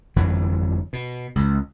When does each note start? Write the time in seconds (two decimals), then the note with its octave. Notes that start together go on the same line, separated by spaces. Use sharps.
0.16 G1 F2 E3 F#3
0.93 B2
1.36 C#2